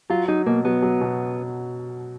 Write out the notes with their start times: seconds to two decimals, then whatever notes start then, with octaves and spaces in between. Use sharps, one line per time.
0.10 F#3 F4
0.28 F#3 D#4
0.46 B2 A#3
0.65 F#3 B3
0.82 F#3
1.01 B2